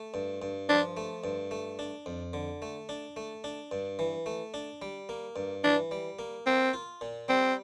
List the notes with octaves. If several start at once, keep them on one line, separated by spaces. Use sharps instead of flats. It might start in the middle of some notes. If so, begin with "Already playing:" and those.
Already playing: A3
G2
G2
F3 D4
A3
G2
A3
D4
F2
D3
A3
D4
A3
D4
G2
E3
A3
D4
G3
A#3
G2
E3 D4
G3
A#3
A#3 C4
F4
A#2
G3 C4